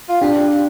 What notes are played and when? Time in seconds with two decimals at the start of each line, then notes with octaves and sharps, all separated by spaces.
0.09 F4
0.21 D4 G4